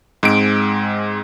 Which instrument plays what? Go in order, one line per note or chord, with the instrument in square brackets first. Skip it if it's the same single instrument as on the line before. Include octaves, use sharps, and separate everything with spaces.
[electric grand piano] G#2 G#3 C4 D7